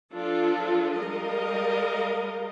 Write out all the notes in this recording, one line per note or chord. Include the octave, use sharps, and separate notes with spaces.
F3 D4 F4 A4
G3 G#3 A#4 D#5 F5